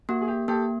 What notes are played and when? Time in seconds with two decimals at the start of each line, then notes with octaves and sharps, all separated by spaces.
0.09 A#3 F#4
0.21 G#4
0.28 G4
0.48 A#3 G4 A4